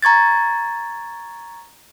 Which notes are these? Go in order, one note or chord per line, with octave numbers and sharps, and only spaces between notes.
A#5 C#6 G#6 A6